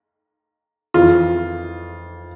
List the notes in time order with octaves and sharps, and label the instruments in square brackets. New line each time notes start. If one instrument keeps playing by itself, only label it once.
[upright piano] F2 E3 F4